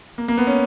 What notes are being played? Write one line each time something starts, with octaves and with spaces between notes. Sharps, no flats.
A#3
A#3
B3
C#4